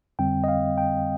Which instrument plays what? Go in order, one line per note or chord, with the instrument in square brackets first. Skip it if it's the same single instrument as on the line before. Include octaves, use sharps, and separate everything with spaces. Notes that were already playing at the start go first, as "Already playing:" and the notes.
[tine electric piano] F2 D3 G3 C4 G5
D#5
F5
G5